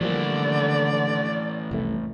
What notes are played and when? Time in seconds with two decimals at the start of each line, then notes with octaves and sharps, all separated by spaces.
0.01 A2 D3 E3 F3 G3 A#3 D5
1.71 F1 C2 A3